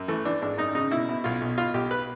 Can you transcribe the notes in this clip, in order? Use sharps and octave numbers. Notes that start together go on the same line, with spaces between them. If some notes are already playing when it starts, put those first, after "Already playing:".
Already playing: F#2
E3 A3
E3 D4
G#1 D4
F#2 D#4
C#3 D#4
B2 E4
B2
B1 F4
B1
B2 F4
B1 G4
B4